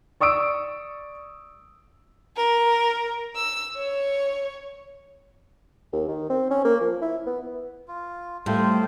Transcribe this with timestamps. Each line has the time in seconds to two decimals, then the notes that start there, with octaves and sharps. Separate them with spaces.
0.20 D5 C#6 D#6 E6 D7
2.37 A#4
3.36 E6
3.76 C#5
5.93 D#2
6.08 D#3
6.30 C4
6.50 C#4
6.65 A#3
6.81 F3
7.02 E4
7.26 B3
7.88 F4
8.46 A2 G3 A3 C4 F4 C5